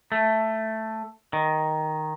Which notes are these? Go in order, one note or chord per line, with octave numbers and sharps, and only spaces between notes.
A3
D#3